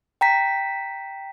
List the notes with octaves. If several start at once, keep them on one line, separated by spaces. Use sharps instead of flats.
G5 A#5 B6